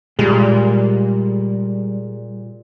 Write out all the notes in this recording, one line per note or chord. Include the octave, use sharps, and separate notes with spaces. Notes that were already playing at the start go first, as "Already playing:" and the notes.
A#2 G3 G#3